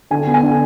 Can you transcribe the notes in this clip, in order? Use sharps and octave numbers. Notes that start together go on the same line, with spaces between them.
D3 G#5
B3
G#5
D3